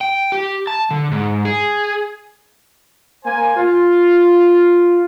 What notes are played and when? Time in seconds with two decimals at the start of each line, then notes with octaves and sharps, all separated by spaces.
0.01 G5
0.32 G4
0.67 A5
0.91 D3
1.12 G#2
1.45 G#4
3.25 A#3 C5 G#5
3.56 F4